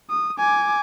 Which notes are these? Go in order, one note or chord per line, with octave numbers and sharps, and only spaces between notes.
D#6
G#5 D6